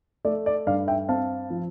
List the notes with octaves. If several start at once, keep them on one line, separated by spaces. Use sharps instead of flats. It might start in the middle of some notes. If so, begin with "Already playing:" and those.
A3 D5
D5
G2 D5 F5
E5 G5
C4 F5 A5
F3